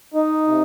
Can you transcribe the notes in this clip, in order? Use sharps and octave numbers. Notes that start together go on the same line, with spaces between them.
D#4
C3